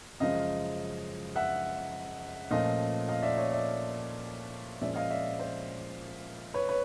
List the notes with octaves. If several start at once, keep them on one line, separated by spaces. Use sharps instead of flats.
F#2 C#3 F3 G#3 D#5 F5
E5 F#5
A#2 F3 A3 C#4 D#5 F5
D#5 F5
D5 E5
C#5 D#5
D5 E5
A#2 F3 G#3 C#4 D5 E5
D#5 F5
D5 E5
C5
B4 C#5
B4 C#5